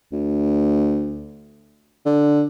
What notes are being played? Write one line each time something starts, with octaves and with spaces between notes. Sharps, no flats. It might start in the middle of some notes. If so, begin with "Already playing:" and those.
D2
D3